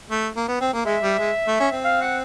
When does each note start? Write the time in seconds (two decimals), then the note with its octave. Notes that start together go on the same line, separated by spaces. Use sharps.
0.11 A3
0.37 A#3
0.48 B3
0.61 C4
0.73 A#3
0.85 G#3 E5
1.02 G3
1.19 G#3
1.47 A3
1.60 C#4
1.72 C4
1.84 F5
2.01 F#5